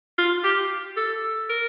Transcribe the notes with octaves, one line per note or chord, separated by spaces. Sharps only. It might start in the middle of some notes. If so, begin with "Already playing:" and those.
F4
G4
A4
A#4